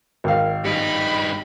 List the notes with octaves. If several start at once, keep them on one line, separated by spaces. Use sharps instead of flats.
G#1 A#4 F5
G2 D#4 G4 B5